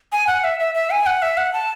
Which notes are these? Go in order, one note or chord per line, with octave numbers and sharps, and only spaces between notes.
G#5
F#5
E5
E5
E5
G#5
F#5
E5
F#5
A5